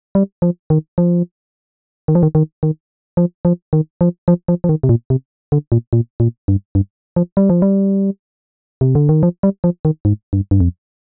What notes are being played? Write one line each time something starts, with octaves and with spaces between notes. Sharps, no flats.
G3
F3
D#3
F3
D#3
F3
D#3
D#3
D#3
F3
F3
D#3
F3
F3
F3
F3
D#3
C3
A#2
C3
D3
A#2
A#2
A#2
G2
G2
F3
G3
F3
G3
C3
D3
D#3
F3
G3
F3
D#3
G#2
G2
G2
F2